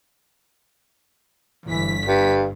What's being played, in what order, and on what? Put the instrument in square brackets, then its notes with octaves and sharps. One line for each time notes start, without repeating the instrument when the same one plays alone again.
[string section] G1 B6 [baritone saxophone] E3
[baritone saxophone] G2